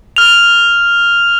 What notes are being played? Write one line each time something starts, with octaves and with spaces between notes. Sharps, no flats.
F6 F7